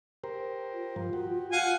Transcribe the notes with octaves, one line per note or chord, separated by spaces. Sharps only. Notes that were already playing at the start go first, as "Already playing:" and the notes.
G4 A#4 C5
F4
G2 F3
F#4 G4
F5 F#5 G#5